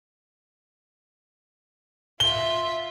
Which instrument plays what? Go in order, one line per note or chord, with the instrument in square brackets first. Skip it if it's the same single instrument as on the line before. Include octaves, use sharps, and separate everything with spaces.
[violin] F4 E5 [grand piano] G7